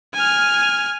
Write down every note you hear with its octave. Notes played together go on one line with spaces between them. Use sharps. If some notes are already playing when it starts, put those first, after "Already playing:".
G#5 F6